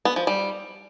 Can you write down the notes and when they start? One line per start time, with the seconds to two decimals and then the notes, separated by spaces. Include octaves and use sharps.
0.05 B3
0.16 F3
0.27 G3